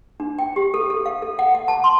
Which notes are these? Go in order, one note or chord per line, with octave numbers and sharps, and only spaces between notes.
D4
G5
G4
A4
A4
F5
A4
F#5
F#5
A5
C6